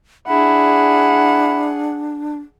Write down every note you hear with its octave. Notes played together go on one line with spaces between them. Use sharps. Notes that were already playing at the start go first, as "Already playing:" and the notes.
D4 E4 G#4 F#5